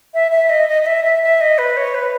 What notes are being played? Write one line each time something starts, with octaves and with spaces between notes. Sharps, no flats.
E5
E5
D#5
D#5
D#5
E5
E5
E5
D#5
B4
C#5
B4